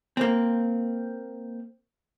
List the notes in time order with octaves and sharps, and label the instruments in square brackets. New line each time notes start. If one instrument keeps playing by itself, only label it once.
[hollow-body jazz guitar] A#3 C4